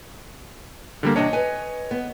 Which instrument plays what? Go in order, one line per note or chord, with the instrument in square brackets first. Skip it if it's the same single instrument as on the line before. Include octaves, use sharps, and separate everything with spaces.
[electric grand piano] D3 G3 A#3
[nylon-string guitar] C3 E3 D4 [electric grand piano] C#5 D#5
[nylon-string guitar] B4 G#5
B3